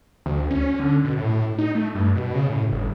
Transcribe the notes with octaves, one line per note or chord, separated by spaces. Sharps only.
D2
C#4
D3
B2
A2
D#4
A3
G2
B2
C#3
A2
G1